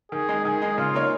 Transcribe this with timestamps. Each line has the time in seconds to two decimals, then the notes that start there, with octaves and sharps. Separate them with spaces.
0.12 D#3 G#4
0.29 G#3 D#4
0.45 D#3 G#4
0.62 G#3 D#4
0.78 C#3 F4
0.94 A#3 D#4 C#5